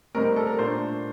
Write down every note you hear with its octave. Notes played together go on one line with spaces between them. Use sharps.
A2 G3 C4 D#4 A#4
A#4
A4
A#4
A#2 A3 D4 C5